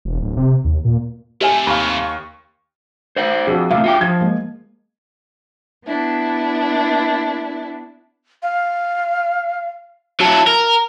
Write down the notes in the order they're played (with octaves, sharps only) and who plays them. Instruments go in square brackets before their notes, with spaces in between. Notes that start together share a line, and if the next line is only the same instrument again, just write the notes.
[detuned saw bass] E1
D1
C3
D#2
A#2
[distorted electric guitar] C3 A3 [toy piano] G4 E5 G#5
[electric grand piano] D#2 F5 [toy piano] B5 [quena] C#6
[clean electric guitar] C5 D5 F#5
[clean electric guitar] F2 [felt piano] F#4 G#4
[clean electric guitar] A2 C3 F#3 [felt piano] E5 F5
[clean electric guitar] F4 F#4 G5
[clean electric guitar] F3 [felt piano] G#6
[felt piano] G#3 A#3
[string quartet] B3 D4 E4
[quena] F5
[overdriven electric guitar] F#3 E4 [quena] A5
[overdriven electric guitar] A#4 [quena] A#5